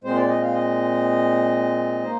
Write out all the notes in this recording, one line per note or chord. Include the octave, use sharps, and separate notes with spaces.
A#2 G#3 C4 C5
D5
D#5
F5
D#5
A#3 D#4 C5